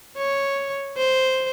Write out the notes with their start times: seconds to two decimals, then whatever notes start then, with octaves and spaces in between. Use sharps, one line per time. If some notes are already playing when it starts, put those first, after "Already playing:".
0.17 C#5
0.97 C5